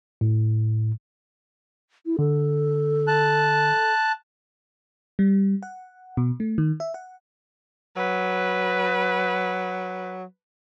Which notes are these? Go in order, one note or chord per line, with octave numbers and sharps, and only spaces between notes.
A2
E4
D3 A4
A5 F#6
G3
F#5
B2
A3
D#3
E5
F#5
F#3 B4